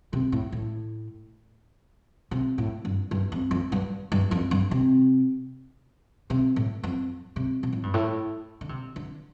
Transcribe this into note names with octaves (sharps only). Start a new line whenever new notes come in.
C3
A2
A2
C3
A2
G2
G2
F2
F2
G2
G2
F2
G2
C3
C3
A2
F2
C3
C3
A2
G2
A2
D3
C3
D3